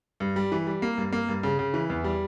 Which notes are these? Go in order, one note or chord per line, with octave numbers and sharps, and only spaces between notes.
G2
G3
E3
G3
A#3
G2
A#3
G2
C#3
C#3
E3
E2
G3